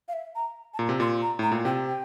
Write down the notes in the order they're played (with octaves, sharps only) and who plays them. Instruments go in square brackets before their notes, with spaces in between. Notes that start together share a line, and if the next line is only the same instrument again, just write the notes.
[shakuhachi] F5
E5
A#5
A5
[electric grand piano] A#2 [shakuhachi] A#5
[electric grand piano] C3
[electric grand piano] A#2 [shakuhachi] C6
[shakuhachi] A#5
[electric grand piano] A2 [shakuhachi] A#5
[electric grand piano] A#2
[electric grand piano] C3 [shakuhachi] G5
[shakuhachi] G5